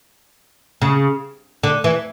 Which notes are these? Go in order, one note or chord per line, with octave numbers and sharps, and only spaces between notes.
C#3
D3
E3